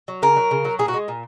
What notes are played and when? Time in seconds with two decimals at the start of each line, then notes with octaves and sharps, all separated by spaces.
0.08 F#3
0.22 C#3 A#4
0.36 F#3
0.51 C#3
0.65 F#3
0.79 A#2 G#4
0.88 F#4
0.94 G#3
1.08 A#2